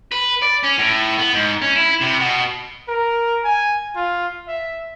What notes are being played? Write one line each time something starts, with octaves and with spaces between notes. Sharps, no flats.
B4
D5
C#4
A2
B3
G#2
C#4
E4
C3
B2
A#4
G#5
F4
E5